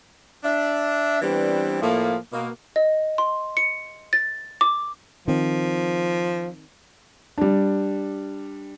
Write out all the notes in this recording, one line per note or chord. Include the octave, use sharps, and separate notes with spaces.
D4 E5
E3 G3 B3 C4 D4
A2 F3 A3 A#3
B2 A#3
D#5
C6
C#7
A6
D6
D#3 F3 C4
G3 D4